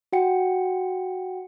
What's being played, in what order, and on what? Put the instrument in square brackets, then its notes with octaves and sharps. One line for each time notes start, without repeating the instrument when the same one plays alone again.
[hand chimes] F#4 F#5 G5 C#7